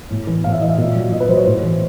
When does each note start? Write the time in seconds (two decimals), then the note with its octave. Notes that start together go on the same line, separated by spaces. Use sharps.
0.11 A2
0.27 E3
0.44 A2 F5
0.53 E5
0.61 E3 D#5
0.69 E5
0.78 A#2
0.95 F#3
1.12 A#2 D#5
1.20 B4
1.29 F#3 C5
1.38 C#5
1.46 A2 C5
1.63 E3